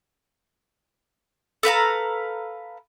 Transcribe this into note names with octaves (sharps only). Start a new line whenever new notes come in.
A4 B4 F5 A#5